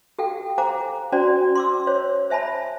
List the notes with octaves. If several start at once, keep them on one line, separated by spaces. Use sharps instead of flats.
G4 A4 F5 G5
C5 F5 G#5 A#5 D6
C#4 F#4 C5 D5 G#5
C6 D6 E6
C5 C#5
C5 E5 G#5 A5 B5